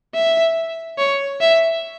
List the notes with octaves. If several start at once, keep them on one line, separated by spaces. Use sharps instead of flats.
E5
C#5
E5